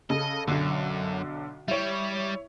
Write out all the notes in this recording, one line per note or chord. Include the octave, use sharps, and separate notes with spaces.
C#3 A4 D#5
B1 F#2 D3
G3 E4 G4 C#5